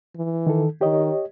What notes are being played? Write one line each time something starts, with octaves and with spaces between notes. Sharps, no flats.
E3
D#3 A4
D#3 G4 C#5 D#5